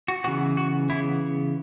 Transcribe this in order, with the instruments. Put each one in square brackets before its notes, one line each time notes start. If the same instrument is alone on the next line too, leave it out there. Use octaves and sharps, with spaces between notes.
[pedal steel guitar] F#4
C#3 E3 B3 F#4
F#4
C#3 E3 B3 E4